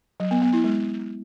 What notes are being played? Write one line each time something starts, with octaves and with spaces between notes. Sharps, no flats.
F#3
B3
B3
E4
G#3